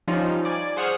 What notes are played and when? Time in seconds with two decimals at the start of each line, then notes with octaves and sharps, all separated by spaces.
0.08 F3 G3 C#4 D#4 F4
0.45 D5 G#5
0.76 G#4 C5 F#5 C#6 D#6 F6